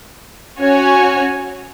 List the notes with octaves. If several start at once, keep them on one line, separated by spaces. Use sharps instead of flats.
C#4 F#4 C#5 G#5